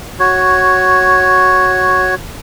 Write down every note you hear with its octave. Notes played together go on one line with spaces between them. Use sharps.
F#4 C#5